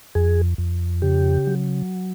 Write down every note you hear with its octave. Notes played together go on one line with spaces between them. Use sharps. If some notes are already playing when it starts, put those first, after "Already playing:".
F2 G#4
F2
C#3 G4
F#3